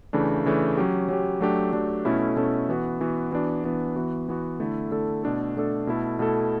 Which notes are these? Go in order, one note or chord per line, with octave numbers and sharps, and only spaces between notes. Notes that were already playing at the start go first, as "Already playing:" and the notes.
C#3 E3 A3 D4
C#3 E3 A3 D4
F#3 C#4 G4
F#3 C#4 G4
F#3 A3 D4 G4
F#3 A3 D4 G4
B2 A3 C#4 E4 A4
B2 A3 C#4 E4 A4
E3 B3 F#4
E3 B3 F#4
E3 B3 D4 F#4
E3 B3 D4 F#4
E3 B3 F#4
E3 B3 F#4
D3 A3 E4 A4
D3 A3 E4 A4
B2 A3 D4 A4
B2 A3 D4 A4
B2 A3 E4 A4
B2 A3 E4 A4